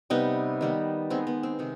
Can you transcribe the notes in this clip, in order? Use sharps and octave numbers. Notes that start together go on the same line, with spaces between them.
C3 G3 B3 D#4
D#3 G3 B3
D#3 G#3 B3 C4
B3
C4
C3 D#3 G#3